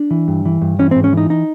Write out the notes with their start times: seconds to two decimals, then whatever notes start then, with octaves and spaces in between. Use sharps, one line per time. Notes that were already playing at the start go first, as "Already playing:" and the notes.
Already playing: D4
0.11 E3
0.28 G2
0.45 E3
0.62 G2
0.79 E3 C#4
0.91 C4
0.96 G#2
1.04 C#4
1.13 E3 D#4
1.30 D#4